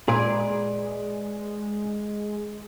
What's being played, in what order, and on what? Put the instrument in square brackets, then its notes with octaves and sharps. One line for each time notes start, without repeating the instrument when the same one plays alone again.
[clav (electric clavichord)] A#2 [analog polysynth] G#3 [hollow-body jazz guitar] G#4 B4 D5